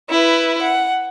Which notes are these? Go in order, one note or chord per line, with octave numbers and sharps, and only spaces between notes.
E4 B4
F#5